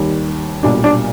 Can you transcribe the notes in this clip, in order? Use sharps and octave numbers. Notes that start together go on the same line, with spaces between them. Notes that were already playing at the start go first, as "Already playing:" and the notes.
Already playing: D#2 D#3 G3
B1 A#2 G3 D4
D4